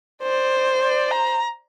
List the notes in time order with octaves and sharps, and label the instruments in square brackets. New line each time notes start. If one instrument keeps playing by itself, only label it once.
[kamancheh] C5 [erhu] D5
[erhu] D5
A#5